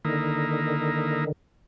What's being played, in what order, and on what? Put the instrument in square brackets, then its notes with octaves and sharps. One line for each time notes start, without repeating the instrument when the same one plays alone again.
[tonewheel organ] D3 D#3 [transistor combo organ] A#3 D#4 E4